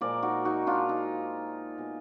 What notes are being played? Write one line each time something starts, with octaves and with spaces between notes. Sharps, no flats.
A#2 F3 G#3 A#4 D5
D#4 F#4
D#4 F#4
D4 F4
D#4
B2 G#3